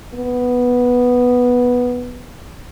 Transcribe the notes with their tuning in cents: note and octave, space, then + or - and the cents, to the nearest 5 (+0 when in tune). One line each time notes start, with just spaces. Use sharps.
B3 -5